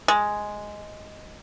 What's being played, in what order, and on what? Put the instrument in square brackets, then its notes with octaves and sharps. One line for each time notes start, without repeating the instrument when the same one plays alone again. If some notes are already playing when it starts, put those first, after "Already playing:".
[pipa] G#3